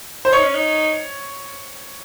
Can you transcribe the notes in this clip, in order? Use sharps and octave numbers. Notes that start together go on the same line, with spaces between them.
C5
D#4 C#5
C#4
D#4